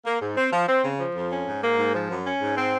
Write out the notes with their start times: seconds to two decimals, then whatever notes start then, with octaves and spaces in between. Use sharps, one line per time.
0.05 A#3
0.21 G#2
0.37 C4
0.52 F3
0.68 C4
0.84 C#3
0.99 F3
1.15 F2
1.31 C#4
1.47 G#2
1.62 A#3
1.78 G#2
1.94 F3
2.10 F#2
2.25 C#4
2.41 G#2
2.56 C4